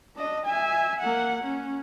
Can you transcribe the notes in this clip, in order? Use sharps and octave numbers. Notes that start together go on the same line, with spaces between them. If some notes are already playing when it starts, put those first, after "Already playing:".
D4 D#5
E5 G#5
A#3 F#5
C#4